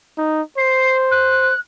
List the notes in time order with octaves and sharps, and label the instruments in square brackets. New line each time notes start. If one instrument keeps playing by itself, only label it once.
[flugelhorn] D#4
[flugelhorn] C5 [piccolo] C7
[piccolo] F#6